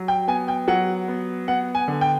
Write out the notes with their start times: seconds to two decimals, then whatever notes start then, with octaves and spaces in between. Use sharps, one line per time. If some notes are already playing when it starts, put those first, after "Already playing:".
Already playing: F#3
0.08 G5
0.28 B3 G#5
0.48 G5
0.68 F#3 F#5
1.08 B3
1.48 B3 F#5
1.75 G#5
1.88 D3
2.01 G5